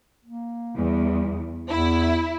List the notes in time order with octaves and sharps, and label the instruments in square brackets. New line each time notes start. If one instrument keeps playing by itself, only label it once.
[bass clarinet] A#3
[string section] E2 [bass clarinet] G3
[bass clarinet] E2 [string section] E4